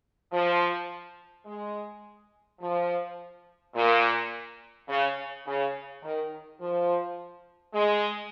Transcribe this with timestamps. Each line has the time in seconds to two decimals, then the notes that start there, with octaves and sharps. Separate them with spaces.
0.32 F3
1.46 G#3
2.60 F3
3.75 A#2
4.88 C#3
5.46 C#3
6.02 D#3
6.60 F3
7.74 G#3